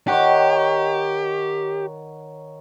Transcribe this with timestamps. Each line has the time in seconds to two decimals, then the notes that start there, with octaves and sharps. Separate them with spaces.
0.08 D#3 G4 C#5 F#5